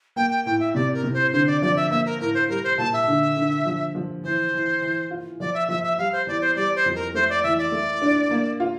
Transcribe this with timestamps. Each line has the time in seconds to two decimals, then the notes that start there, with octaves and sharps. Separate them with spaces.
0.16 A#3 G5
0.30 G5
0.45 A2 G5
0.60 E5
0.75 C3 D5
0.94 A#4
1.03 C3
1.13 C5
1.33 D3 C5
1.47 D5
1.62 F3 D5
1.76 E5
1.90 A#3 E5
2.06 A#4
2.20 A2 A#4
2.34 C5
2.49 G3 A#4
2.64 C5
2.77 A#2 A5
2.93 E5
3.08 D3
3.37 D3
3.65 F3
3.95 F3
4.24 E3 C5
4.53 E3
4.82 E3
5.11 F4
5.40 F3 D5
5.54 E5
5.69 F3 E5
5.83 E5
5.98 G3 F5
6.12 C5
6.27 E2 D5
6.41 C5
6.56 G3 D5
6.76 C5
6.86 F2
6.95 A#4
7.14 A3 C5
7.30 D5
7.43 E3 E5
7.59 D5
7.72 A3
8.02 D4
8.31 A#3
8.60 F4